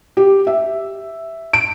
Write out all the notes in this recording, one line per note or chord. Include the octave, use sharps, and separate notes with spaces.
G4
E5
D7